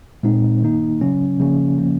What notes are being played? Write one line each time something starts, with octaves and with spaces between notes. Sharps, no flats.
A#2 G#3 C4 D#4
D#3 A#3 D#4
C#3 F#3 C#4
C#3 F3 A#3 C#4
C#3 F3 A#3 C#4